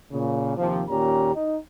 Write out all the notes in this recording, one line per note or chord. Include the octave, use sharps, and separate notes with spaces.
A#2 C#3
D#2 C3 F3
D#2 A#2 C#4 G4 A#5
D#4